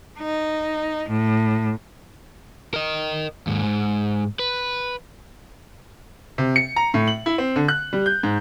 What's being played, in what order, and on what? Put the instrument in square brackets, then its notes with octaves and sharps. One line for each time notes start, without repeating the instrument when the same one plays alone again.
[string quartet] D#4
A2
[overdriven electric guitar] A#4 D#5
D#2 G#2
G#2
B4
[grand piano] C3
C#7
A#5
A2
F#7
E4
C4
D3
F#6
G3
G6
G#2